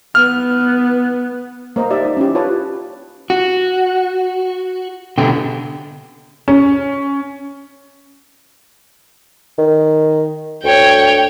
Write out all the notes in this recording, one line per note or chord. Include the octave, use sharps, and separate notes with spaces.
B3 F6
A#3 C5 D#5 A#5
D#4 G4 D5 E5
D#4
C#4 E4 G4
F4 B4 C#5 A5
F#4
B2 D3 G5
C#4
D#3
D2 C#5 G5